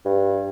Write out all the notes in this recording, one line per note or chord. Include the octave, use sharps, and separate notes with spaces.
G2